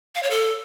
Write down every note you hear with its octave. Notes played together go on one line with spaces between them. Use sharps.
F5
C#5
A4